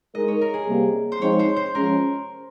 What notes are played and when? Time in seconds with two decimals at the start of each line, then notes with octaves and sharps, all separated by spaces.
0.14 G#3 D#4 A#4 D#5
0.28 C#5
0.41 A#4
0.54 G#4
0.67 C3 G3 A#3
1.12 C5
1.21 F3 G#3 C4 D#4 C#5
1.39 C5
1.56 C5
1.75 F3 G#3 C#4 A#4